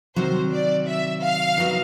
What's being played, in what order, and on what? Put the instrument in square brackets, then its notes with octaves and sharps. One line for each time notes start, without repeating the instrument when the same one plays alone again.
[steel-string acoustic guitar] C3 D#3 F#3 [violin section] C5
[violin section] D5
E5
F5
[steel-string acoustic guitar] D#3 F#3 B3 D#4